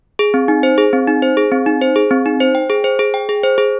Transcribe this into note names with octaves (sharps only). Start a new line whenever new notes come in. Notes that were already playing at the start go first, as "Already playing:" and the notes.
G#4
C4
D#4
C5
G#4
C4
D#4
C5
G#4
C4
D#4
C5
G#4
C4
D#4
C5
G5
G#4
C5
G#4
G5
G#4
C5
G#4